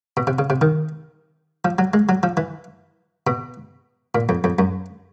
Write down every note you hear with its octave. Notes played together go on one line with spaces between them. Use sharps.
B2
C3
C#3
C3
D#3
F3
F#3
G#3
F#3
F3
E3
B2
A#2
F2
F2
F#2